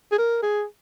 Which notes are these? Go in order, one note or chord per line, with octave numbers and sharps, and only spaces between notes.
G#4
A#4
G#4